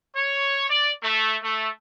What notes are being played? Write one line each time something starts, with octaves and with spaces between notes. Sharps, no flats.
C#5
D5
A3
A3